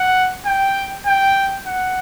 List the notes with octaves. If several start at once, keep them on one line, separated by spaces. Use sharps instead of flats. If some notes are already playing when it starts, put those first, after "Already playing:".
Already playing: F#5
G5
G5
F#5